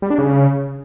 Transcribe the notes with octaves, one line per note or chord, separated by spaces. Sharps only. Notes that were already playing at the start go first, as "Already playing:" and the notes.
G3
D4
C#3